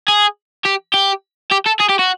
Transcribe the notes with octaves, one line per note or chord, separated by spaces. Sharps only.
G#4
G4
G4
G4
A4
G#4
G4
F#4